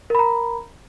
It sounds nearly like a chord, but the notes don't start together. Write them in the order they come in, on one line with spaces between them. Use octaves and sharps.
A#4 B5 A#5